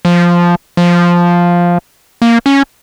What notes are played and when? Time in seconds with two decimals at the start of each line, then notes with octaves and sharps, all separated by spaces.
0.05 F3
0.77 F3
2.22 A#3
2.46 C#4